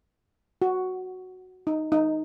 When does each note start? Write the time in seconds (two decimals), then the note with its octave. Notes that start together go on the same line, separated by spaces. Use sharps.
0.62 F#4
1.67 D#4
1.92 D#4